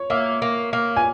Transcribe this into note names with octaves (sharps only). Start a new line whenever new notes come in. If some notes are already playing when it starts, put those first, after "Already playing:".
Already playing: C#5
A#3 E5
A#3
A#3
G#5